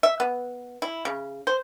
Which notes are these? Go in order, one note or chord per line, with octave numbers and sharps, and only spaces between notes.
E5
B3
E4
C#3
C5